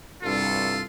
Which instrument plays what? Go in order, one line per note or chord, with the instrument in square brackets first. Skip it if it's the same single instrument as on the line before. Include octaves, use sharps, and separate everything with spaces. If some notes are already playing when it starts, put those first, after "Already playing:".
[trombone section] C2 G2 [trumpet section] F4 A4